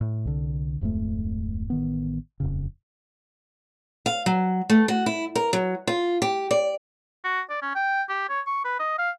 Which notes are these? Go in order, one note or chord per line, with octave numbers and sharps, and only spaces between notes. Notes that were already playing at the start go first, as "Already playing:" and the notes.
A2
C2 D3
D1 F2 G#2 A3
A1 D#3 B3
D#1 F2 C#3
F5
F#3
A3
F#4
E4
A#4
F#3
F4
G4
D5
F#4
D5
C#4
G5
G4
C#5
C#6
B4
D#5
F5